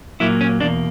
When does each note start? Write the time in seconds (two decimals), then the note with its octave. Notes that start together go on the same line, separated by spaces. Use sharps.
0.20 A#2 F#3 A#3 E4
0.41 C#4
0.60 E2 B2 A#3 D4